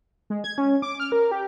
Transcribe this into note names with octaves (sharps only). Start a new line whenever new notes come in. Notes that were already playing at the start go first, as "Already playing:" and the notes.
G#3
G#6
C#4
D6
F6
A#4
G4